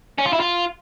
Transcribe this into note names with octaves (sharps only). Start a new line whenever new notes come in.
C#4
F4
E4
F4